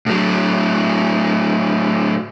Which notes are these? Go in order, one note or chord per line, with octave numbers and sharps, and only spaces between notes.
A2 F#3